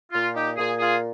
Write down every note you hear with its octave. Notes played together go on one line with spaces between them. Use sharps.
A#2 F4
D#4 G4
A#2 F4 G#4
F4 G#4